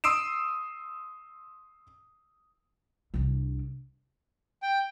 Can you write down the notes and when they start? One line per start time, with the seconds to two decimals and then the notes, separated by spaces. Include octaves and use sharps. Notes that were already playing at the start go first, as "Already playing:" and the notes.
0.04 C6 D#6 E6 C7 D7 E7
3.14 C2 D4
4.62 G5